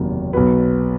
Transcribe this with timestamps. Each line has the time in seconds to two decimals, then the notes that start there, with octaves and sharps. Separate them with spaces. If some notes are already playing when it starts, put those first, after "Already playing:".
Already playing: F#1 E2 C3 D#3 F#3
0.33 B1 B2 F#3 B4